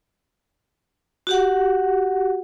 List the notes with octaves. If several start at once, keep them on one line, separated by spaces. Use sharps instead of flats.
F#4 G4 F#5